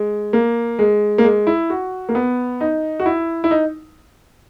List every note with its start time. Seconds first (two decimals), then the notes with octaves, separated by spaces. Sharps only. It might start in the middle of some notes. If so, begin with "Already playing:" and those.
Already playing: G#3
0.33 A#3
0.79 G#3
1.18 A#3
1.24 G#3
1.47 E4
1.70 F#4
2.09 A#3
2.15 B3
2.61 D#4
3.00 F#4
3.06 E4
3.44 E4
3.51 D#4